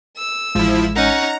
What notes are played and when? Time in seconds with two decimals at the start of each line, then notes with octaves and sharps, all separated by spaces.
0.17 E6
0.55 A1 F3 G#3 E4
0.96 C#4 D#4 F#5 A#5 C#6